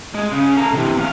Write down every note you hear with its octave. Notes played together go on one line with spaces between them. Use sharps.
G#3
C#3
A3 A#5
C3 E3
E2 F5